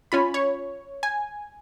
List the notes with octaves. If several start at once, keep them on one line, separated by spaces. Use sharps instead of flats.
C#4 F4 B5
C#5
G#5